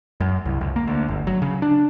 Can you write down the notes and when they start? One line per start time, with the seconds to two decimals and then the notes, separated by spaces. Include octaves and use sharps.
0.20 F#2
0.45 C2
0.61 C#2
0.76 A#3
0.87 D2
1.08 G1
1.27 F#3
1.42 C#3
1.62 D4